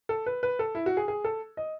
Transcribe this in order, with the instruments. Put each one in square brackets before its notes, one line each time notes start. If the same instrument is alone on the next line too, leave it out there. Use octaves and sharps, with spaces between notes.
[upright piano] A4
B4
B4
A4
E4
F#4
G#4
G#4
A4
D#5